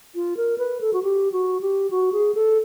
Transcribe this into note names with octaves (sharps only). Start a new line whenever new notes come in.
F4
A#4
B4
A4
F#4
G4
F#4
G4
F#4
G#4
A4